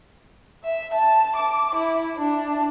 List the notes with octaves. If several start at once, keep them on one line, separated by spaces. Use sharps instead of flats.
E5
A5
D6
E4
D4